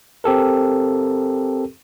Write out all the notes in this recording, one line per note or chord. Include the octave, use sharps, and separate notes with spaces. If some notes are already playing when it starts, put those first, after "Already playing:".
C4 G4 A4 A#4